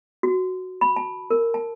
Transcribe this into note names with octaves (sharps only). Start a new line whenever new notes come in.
F#4
B5
A5
A#4
A5